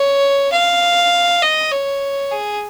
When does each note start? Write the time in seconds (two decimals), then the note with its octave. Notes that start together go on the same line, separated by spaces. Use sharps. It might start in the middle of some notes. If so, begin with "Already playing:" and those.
Already playing: C#5
0.52 F5
1.42 D#5
1.72 C#5
2.31 G#4